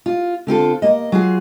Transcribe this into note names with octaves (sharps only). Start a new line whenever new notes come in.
F4
D3 C4 F4 A4
A#3 D#5
F#3 F4 G#4